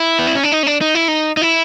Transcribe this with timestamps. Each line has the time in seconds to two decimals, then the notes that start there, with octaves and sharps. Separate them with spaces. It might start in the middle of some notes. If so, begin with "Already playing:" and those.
Already playing: E4
0.19 B3
0.27 C4
0.35 C#4
0.43 D4
0.52 D#4
0.63 C#4
0.67 D4
0.81 D#4
0.95 E4
1.08 D#4
1.37 D#4
1.41 E4